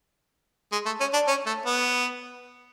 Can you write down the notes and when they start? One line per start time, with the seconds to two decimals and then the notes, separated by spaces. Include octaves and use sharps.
0.72 G#3
0.85 A3
1.00 C#4
1.13 D4
1.28 C#4
1.46 A3
1.66 B3